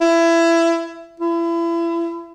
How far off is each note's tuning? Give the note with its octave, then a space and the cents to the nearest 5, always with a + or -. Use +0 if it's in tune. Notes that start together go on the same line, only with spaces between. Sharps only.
E4 +20
E4 +35